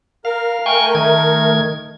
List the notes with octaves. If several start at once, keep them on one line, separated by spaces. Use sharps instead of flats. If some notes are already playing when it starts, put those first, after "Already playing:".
A#4 F5
A3 A#4 G5 G#5 C#6
D#3 G#6